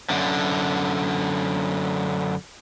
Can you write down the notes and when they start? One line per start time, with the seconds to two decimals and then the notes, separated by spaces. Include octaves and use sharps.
0.10 F#2 D3